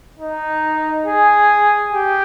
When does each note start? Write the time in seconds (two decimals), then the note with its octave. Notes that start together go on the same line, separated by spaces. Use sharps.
0.19 D#4
1.06 G#4
1.93 G4